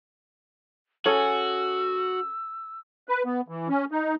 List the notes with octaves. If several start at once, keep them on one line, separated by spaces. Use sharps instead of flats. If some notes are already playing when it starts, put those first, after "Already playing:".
C#4 F#4 G#4 A4 E6
B4
B3
E3
C#4
D#4